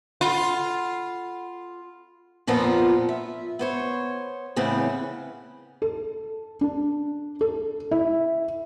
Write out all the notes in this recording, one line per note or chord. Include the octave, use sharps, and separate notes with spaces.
F4 A4 F#5 B5
F2 A#2 F3 B3 F4 A#5
E5
B3 C5 C#5
E2 A2 C#3 E3 B3 C4
A4
D4
A4
E4